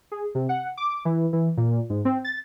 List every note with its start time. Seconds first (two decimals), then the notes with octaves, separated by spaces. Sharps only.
0.12 G#4
0.35 C3
0.49 F#5
0.77 D6
1.05 E3
1.33 E3
1.57 A#2
1.90 G#2
2.05 C4
2.24 A6